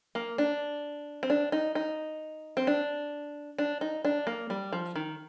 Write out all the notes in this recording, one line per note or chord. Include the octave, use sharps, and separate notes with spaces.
A#3
D4
C4
D4
D#4
D#4
C4
D4
D4
D#4
D4
A#3
G3
F3
D#3